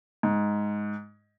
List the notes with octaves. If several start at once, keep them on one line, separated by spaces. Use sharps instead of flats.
G#2